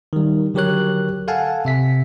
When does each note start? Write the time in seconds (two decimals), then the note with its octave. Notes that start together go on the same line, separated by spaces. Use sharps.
0.13 D#3 G3
0.54 D3 F#3 G4 A#4 C#5 F#6
1.28 A4 F5 F#5 G#5 A5
1.65 C3 E5 B6